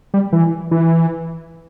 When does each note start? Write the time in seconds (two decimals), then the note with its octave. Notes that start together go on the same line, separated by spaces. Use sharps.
0.14 G3
0.33 E3
0.71 E3